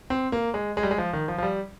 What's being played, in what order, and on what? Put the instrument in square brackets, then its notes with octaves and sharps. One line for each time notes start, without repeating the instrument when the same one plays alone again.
[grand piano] C4
A#3
G#3
G#3
G3
G#3
F3
D#3
F3
F3
G3